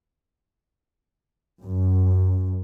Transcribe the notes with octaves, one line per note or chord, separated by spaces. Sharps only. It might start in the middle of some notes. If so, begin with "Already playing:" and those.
F#2